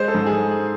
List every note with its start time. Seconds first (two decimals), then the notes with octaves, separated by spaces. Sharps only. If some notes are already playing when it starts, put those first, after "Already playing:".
Already playing: G#3 C5
0.08 A4
0.15 G#2
0.26 G#4